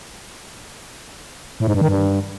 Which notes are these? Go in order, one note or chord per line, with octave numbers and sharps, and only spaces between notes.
A2
G#2
G2
D#3
G2